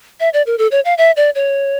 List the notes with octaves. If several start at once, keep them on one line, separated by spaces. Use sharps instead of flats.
E5
D5
A#4
A4
C#5
F5
E5
D5
C#5